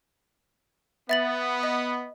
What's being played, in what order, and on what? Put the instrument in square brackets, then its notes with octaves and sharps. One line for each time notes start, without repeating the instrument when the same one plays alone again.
[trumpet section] B3 [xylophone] E5 A6 F#7
[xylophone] D#5